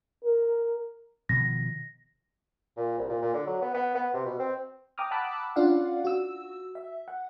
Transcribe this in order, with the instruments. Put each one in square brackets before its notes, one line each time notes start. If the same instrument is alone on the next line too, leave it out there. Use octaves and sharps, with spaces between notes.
[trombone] A#4
[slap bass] B2 D#3 F3 [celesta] A#6
[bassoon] A#2
C2
A#2
A#2
D3
F#3
B3
B3
B3
C3
B2
C4
[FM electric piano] G5 A#5 D6 D#6 F6
F#5 A5 B5 D6 E6 F#6
C#4 D4 F4 D5 F5 F#5
F#4 E6
E5
F#5